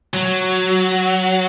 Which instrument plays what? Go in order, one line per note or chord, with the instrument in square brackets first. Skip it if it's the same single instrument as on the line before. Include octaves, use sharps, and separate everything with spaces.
[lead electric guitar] F#3